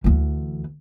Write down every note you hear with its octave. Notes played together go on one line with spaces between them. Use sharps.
D2 E3